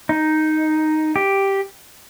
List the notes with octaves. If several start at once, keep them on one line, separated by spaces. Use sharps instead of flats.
D#4
G4